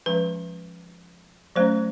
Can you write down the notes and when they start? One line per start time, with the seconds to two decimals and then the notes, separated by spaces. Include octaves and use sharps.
0.06 F3 G#3 C#4 B4
1.56 F#3 A3 C#4 C5